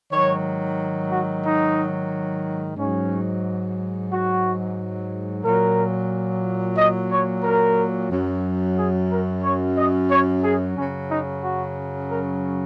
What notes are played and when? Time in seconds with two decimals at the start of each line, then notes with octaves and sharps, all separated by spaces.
0.11 G#2 D#3 F#3 C#5
1.11 F#4
1.45 D#4
2.77 G#2 F#3 C#4
4.11 F#4
5.44 A#2 F#3 A#4
6.77 D#5
7.11 C#5
7.43 A#4
8.10 F#2 F#3
8.77 G#4
9.10 A#4
9.43 C#5
9.76 D#5
10.10 C#5
10.43 G#4
10.77 F#2 C#3 F#3 C#4
11.10 D#4
11.43 F#4
12.10 A#4